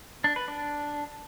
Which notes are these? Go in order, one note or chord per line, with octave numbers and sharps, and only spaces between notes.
D4
B4
D4